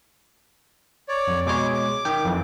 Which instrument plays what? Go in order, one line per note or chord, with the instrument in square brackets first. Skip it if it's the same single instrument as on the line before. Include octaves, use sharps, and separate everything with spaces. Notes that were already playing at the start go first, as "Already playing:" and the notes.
[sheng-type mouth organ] C#5 D5
[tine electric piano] F2
[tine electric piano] B2 G#3 C#5 [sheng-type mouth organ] G#4 D6
[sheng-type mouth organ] D6
[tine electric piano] D#3 G5
F2 E3